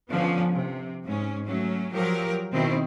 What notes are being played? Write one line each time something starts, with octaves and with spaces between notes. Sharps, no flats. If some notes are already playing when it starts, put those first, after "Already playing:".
D3 F3 B3 C#4
C3
G#2 C#4
F#3 A3 C#4
F3 F#3 G4 A#4
B2 D#3 C4 E4